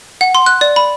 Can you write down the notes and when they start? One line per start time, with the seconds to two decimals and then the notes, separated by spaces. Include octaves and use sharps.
0.21 F#5
0.35 C6
0.46 F#6
0.61 D5
0.76 B5